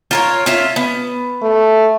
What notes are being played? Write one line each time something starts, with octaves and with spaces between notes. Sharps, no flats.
F4 A#4 C#5
C#4 F4 E5
B3
A3